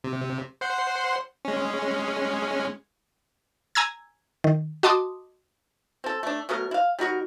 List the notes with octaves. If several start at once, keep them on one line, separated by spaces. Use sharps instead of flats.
C3
C5 F#5 C6
G#3 C#4
G#5 A#5 E6 G#6
D#3
F#4 D#5 A5 C6 D6 D#6
C4 A4
A3 D4
B2 F#3 A3 A#4
E4 F5
G3 D#4 F#4 A#4